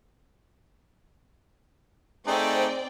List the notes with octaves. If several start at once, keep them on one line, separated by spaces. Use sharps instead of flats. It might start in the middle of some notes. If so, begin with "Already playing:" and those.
A3 C4 D#4 G#4 D5 G5